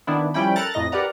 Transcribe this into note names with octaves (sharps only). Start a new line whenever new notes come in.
D#3 B3 D4 E4
F3 G3 C#4 E4 G5 B5
A4 A#4 A#5 F#6 A6
F2 A2 D#5 A#6
G4 A#4 B4 D5 F#5 A#5